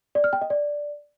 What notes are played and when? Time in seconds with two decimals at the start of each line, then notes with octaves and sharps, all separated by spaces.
0.15 D5
0.24 F6
0.33 G5
0.41 D#5
0.50 D5